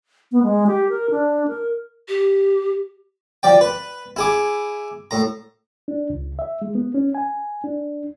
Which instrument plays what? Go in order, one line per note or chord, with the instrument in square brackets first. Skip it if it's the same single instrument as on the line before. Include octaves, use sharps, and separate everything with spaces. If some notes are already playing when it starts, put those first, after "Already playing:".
[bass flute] B3
G#3
G4
A#4
D4
A#4
[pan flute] G4
[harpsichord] F3 D5 G5
B4
E4 G#4 D6
A2 A#5
[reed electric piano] D4
C#2
E5
G#3
B3
C#4
G#5
D4